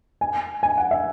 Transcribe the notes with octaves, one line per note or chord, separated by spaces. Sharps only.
G#5
G#5
F#5
E5